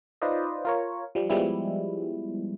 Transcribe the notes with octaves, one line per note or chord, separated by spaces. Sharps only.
D#4 F4 B4 C5 D5 D#5
F4 A#4 C#5
F3 G3
F3 G3 G#3 B3 E4